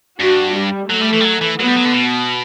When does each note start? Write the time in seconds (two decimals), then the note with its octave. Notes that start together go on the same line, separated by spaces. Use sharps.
0.20 G2 F#4
0.55 G3
0.90 F#3 A3
1.01 G3
1.13 E3
1.20 G3
1.25 F#3
1.41 E3
1.59 F#3 B3
1.68 G3
1.76 F#3
1.85 D3
1.93 B2